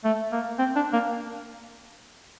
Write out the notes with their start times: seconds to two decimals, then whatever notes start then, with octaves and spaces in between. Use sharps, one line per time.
0.04 A3
0.32 A#3
0.59 C4
0.76 D4
0.93 A#3